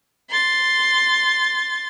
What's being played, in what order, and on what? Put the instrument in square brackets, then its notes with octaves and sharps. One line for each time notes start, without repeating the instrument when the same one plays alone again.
[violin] C6 A6